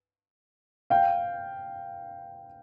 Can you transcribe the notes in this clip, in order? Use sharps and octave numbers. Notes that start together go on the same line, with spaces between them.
F5 G5